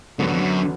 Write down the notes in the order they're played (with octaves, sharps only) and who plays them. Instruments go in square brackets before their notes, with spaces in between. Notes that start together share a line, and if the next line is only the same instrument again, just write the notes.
[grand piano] D2 D3 F#3 B3 F#4 [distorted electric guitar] G#2
[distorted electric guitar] F#2
F2
F#2